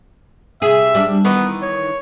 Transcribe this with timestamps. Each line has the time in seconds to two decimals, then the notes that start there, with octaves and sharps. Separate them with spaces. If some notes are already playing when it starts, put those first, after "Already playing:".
0.62 C3 G#4 E5
0.95 G3 D4
1.25 D#3 E3 B3 D#4
1.62 C#5